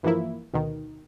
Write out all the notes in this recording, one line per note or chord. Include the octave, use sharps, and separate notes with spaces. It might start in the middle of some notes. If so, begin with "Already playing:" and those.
G2 E3 F3 A#3 E4
D2 B2 D#3